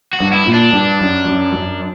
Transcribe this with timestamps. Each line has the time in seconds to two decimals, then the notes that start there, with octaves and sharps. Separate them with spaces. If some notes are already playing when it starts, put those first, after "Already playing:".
0.13 F#4
0.20 G2
0.33 E4
0.46 A#2
0.53 D4
0.73 G2
1.01 F#2
1.27 F#2
1.55 F#2